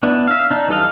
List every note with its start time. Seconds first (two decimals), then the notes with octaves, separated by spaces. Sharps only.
0.03 B3 D4 E4
0.27 E5 F5
0.51 D4 D#4
0.68 E3 G3 A4 D#5 F5